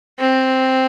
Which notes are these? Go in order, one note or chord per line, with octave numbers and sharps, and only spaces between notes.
C4